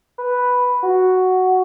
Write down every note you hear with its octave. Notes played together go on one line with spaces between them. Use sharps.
B4
F#4